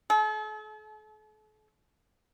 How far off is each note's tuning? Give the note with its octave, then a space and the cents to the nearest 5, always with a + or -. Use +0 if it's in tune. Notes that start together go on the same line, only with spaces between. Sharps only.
A4 -45